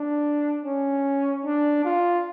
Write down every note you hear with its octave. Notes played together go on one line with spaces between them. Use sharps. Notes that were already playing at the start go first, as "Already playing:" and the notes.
Already playing: D4
C#4
D4
F4